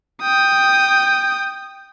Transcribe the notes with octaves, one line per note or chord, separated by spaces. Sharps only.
G5 D#6